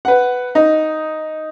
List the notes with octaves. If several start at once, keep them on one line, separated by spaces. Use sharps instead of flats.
B4 F#5
D#4